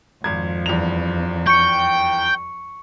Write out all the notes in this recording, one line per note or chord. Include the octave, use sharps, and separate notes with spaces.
G#1 F2 G#6
E2 G2 F7
G5 C#6 C#7